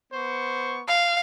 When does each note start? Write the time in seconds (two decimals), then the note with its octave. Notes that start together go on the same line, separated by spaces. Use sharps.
0.12 B3 C5 C#6
0.88 F5